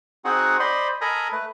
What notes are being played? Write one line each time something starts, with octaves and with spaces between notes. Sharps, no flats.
C4 D#4 F#4 G#4 F#5
C5 D5 D#5 B5 C6
A4 A#4 D#5 G#5 A#5 B5
A3 B4